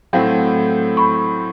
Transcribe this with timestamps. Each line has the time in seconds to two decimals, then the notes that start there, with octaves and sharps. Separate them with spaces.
0.13 A2 F#3 A3 C4 F5 G5
0.97 B5 C#6